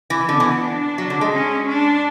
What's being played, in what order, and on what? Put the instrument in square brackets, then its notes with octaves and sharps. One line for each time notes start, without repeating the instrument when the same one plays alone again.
[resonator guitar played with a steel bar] E3
[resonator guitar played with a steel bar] D3 [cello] B3
[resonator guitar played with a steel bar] E3
[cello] D4
[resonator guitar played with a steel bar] F#3
D3
G#3
[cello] C#4
D4